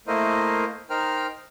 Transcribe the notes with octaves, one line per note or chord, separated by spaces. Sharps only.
A3 A#3 E4 A#4 C5 D#5
D#4 A#4 C5 G5 F6